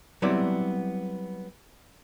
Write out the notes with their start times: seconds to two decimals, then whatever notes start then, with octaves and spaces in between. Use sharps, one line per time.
0.22 F#3 G3 B3 C4 E4 D5